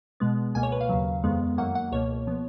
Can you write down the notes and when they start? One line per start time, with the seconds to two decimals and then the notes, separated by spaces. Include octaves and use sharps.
0.20 B2 G#3 B3
0.55 C#2 B2 A#3 G#5
0.63 C#5
0.72 B4
0.81 F5
0.89 D#2 C#3 F#3
1.23 F2 D#3 G#3 B3
1.58 F#2 D#3 F#3 A#3 F#5
1.75 F#5
1.92 C#2 B2 A#3 C#5
2.27 F3 B3